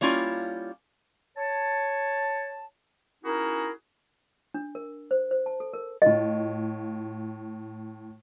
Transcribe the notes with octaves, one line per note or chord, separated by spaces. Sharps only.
G3 A#3 C#4 E4 F4
C#5 A5
C#4 D#4 E4 F#4 G#4 A#4
D4
A#4
C5
C5
A5
A4
A#4
A2 F4 D#5